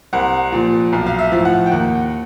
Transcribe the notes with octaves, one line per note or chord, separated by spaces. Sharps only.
C2 F#5
A#2 F3
B1
F5
E5
A2 F3
F#5
G5
D#2 F#5